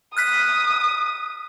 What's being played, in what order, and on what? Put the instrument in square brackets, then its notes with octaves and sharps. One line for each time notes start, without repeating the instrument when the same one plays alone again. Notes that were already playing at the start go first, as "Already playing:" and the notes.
[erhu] D#6 [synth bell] F6 F#6 B6